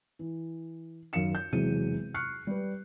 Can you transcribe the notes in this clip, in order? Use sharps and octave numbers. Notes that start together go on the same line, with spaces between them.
E3
F#2 D#3 F5 C#7 E7
G6
E1 E2 C3 F#3 G#4 D#7
C#6 F6 F#6 C7 C#7
G3 B4